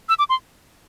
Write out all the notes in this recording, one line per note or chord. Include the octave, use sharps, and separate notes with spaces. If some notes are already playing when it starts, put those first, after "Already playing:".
E6
D6
C6